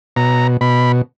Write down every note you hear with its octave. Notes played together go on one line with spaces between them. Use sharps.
B2 A#5
B2 B5